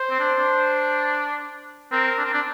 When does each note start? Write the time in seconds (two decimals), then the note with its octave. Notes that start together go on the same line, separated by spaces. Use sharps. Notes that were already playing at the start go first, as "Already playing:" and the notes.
Already playing: C5
0.10 C4
0.20 D4
0.39 D4
1.92 C4 A#4
2.18 D4
2.25 C4
2.33 D4